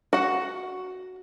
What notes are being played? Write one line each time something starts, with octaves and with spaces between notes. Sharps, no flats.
F#4 F#5